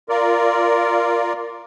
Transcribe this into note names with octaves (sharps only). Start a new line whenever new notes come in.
F4 A#4 D5